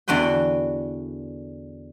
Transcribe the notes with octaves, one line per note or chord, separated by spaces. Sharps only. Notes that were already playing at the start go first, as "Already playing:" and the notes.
E2 D3 F#4 B4 G5